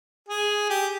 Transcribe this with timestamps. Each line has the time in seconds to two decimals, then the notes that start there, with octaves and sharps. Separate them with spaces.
0.29 G#4
0.70 G4